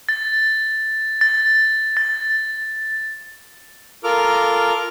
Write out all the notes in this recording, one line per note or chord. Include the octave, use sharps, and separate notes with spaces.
A6
A6
A6
F4 A4 A#4 D6 F6